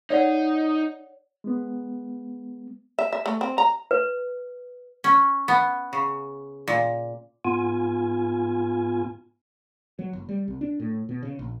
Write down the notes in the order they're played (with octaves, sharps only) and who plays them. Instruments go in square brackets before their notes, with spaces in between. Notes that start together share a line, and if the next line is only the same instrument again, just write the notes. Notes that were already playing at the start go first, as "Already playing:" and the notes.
[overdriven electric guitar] D#4 [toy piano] C#5 D5 F#5
[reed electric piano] G#3 B3
[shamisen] E5
E5
A3
C4
A#5
[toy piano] B4
[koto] C#4
B3
C#3
A#2
[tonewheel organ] G#2 B3 F4 G#5
[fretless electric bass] F#3
F#1
G3
C2
D4
A2
B2
C#3
A#1